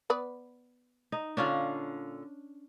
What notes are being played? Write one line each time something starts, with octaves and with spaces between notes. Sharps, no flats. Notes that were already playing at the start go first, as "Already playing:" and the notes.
B3 B4 D5
D#4
A#2 D3 C#4 D4 F4